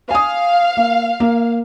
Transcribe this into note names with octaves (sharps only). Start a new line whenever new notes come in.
F5 G#5 D#6
A#3
A#3